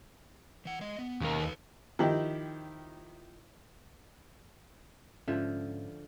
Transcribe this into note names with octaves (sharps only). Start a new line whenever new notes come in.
E3 F#5
G#3 D#5
B3
D#2 B2 A#3 C#4
A4 B4
D#3 F3 D#4 E4 G4
G#2 D3 F3 C#4 E5